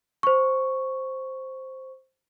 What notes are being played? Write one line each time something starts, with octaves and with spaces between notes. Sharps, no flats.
C5 C#6